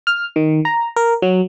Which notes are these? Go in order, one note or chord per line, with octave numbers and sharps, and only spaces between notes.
F6
D#3
A#5
A#4
F#3